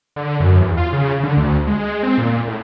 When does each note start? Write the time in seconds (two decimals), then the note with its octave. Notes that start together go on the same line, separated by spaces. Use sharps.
0.16 D3
0.40 F#2
0.59 E2
0.77 F4
0.93 C#3
1.23 D3
1.37 D2
1.67 G#3
2.03 C4
2.18 A#2
2.31 A#2
2.47 A2